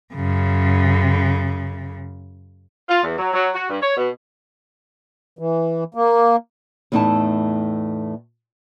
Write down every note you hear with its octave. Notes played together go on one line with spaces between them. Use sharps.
F#2 C#3
F4
E2
F#3
F#3
F#4
G2
C#5
B2
E3
A#3
E2 A2 A3 D#4 E4 A5